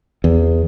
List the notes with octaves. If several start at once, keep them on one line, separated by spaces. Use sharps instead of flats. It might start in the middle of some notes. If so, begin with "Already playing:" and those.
E2